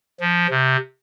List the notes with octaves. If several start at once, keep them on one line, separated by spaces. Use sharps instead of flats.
F3
C3